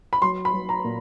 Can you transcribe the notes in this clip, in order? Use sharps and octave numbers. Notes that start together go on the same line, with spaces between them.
B5
F#3 C6
B5
F#3
A#5
A#2